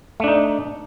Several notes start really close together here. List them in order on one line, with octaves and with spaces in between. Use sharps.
A3 D4 D#4